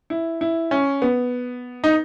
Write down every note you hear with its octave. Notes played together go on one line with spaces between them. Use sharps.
E4
E4
C#4
B3
D#4